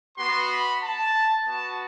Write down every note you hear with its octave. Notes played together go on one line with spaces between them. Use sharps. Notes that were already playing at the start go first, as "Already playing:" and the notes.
B3 F#4 C6
B5
A5
B3 F#4 A5